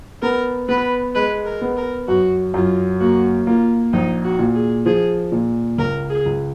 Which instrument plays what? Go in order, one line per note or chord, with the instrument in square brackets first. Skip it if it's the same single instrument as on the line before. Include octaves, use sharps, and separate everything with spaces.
[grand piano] B3 [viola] A#4
[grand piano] B3 [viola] B4
[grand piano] G#3 [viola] B4
[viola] A#4
[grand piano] B3
[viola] A#4
[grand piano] F#2 [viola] F#4
[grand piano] F#2 [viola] F4
[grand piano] A#3 [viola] F#4
[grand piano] A#3 [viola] F4
[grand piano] A#1 [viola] D#4
[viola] F#4
[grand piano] A#2
[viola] G#4
[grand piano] F3 [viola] G#4
[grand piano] A#2
[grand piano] C#2 [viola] A#4
[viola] G#4
[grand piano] C#2